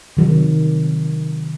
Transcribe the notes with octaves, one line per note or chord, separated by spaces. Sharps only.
C3 D#3 F#3